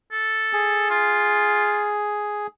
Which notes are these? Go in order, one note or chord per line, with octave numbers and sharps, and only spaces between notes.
A4
G#4
F4